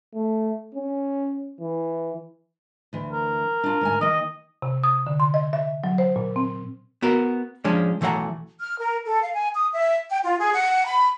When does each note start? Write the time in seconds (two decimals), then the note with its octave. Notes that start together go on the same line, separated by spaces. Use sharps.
0.15 A3
0.75 C#4
1.61 E3
2.93 D2 E3
3.12 A#4
3.64 D4 F4
3.81 D2 G#2 G#5
4.01 D#3 A#3 D#5
4.62 C3
4.84 D#6
5.06 D3
5.20 C6
5.34 D#5
5.53 E5
5.84 F#3
5.98 C5
6.16 A#2
6.36 C4
7.02 B3 F#4 A#4
7.64 F3 G#3 C#4 D4
8.01 B1 E3 A3 C5 F#5 A#5
8.60 F6
8.79 A#4
9.05 A4
9.22 F5
9.35 G#5
9.54 D#6
9.73 E5
10.09 G5
10.24 F4
10.39 G#4
10.55 F#5
10.86 B5